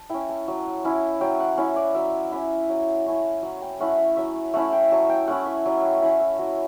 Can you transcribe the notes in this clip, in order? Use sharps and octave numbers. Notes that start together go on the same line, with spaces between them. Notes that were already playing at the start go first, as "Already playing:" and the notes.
Already playing: A5
C#4 E4 G5
A5
F#3
C#4 E4
F#3 G5
F#5
C#4 E4 C#5
D5
F#3 E5
C#4 E4 E5
F#3
A3 C#4 E4
F#3 F#5
G5
A3 C#4 E4 F#5
E5
F#3 E5
A3 C#4 E4 F#5
G5
F#3 A5
G5
A3 C#4 E4 F#5
E5
F#3
G5
A3 C#4 E4 F#5
E5
F#3 F#4